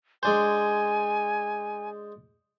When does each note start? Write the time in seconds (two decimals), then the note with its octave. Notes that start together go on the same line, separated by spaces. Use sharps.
0.23 G#3 D4 C5 G#5